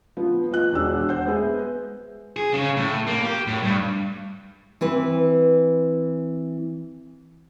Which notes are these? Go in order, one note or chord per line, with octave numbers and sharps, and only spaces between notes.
F3 B3
F3 D#5 F#6
E1 D4 F#4 E6
C5 F#5 G6
G#3 B3 G#4 E5
G#4
C#3
A2
A#3
G4
A2
G2
E3 C4 B4